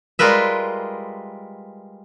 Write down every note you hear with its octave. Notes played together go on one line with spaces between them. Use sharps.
G3 G#3 F4 A#4 B4 E5